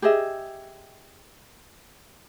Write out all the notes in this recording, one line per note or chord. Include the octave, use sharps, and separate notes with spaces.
G4 G#4 D#5 E5